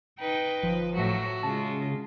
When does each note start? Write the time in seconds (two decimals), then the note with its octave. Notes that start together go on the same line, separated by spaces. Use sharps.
0.19 D#4 B4 G5
0.63 G1 F3
0.94 A2 F#3 F#4 E5
1.43 C#3 G#3 F4 A5